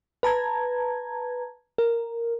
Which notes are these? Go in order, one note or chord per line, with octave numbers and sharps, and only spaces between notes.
B4 A5 A#5 G#6
A#4